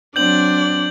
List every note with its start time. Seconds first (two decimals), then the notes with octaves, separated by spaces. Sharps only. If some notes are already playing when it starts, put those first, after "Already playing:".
0.16 F#3 C4 D4 D5 G6 F#7